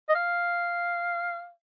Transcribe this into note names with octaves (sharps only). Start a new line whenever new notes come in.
D#5
F5